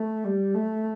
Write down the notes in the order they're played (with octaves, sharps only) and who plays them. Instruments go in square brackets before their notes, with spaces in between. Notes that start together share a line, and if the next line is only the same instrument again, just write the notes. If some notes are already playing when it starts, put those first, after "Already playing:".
Already playing: [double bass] A3
G3
A3